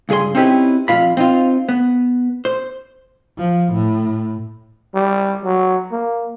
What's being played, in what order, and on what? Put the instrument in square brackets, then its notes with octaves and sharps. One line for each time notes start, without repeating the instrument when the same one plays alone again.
[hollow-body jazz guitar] C#2 G2 G#4 G#5 C6
C4 C#4 D#4 E4 G4 B4
F2 A#2 F4 F5 B5
C4 D#4 F4
B3
C5
[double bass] F3
A2
[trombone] G3
F#3
A#3